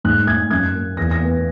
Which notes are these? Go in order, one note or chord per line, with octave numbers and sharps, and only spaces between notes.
G#2 F#6
G#2 G#6
F#2 G#6
A#3
E2 A#6
A#6
B3